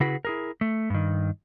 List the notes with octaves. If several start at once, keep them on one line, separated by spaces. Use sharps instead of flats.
C#3 E4 F#4 G#4 B4
E4 G#4 A#4
A3
G2 D#3